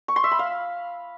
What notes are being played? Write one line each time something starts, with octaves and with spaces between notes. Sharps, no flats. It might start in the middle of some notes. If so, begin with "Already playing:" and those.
C#6
C6
E5
B5
F5